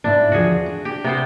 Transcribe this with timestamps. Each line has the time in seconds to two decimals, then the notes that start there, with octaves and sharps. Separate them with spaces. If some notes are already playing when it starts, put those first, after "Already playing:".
0.04 G#2 B3 D4 E4
0.32 E2 D3 F3 F#4 G#4
0.66 D4
0.85 G4
1.04 C3 B3 C5